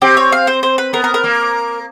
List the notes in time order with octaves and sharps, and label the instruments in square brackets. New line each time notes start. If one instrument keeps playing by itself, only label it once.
[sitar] C4 [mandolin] G4
[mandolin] C#5
F5
C5
C5
B4
[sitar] B3 [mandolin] A#4
[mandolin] A#4
A#4
[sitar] A#3